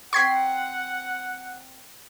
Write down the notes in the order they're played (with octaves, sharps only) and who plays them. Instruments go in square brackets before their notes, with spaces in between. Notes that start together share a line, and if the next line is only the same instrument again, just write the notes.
[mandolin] C4 G5 C6 [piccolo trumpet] F#5 [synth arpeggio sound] C#6 G#6 B6